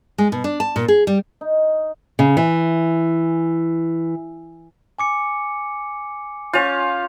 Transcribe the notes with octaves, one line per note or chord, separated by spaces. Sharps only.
G#3
B2
D4
A5
A#2
G#4
G3
D#4
C#3
E3
G#5 D6 C#7
C#4 F4 G6 F7